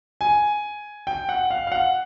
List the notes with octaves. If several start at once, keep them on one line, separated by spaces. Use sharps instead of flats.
G#5
G5
F#5
F5
F5
F#5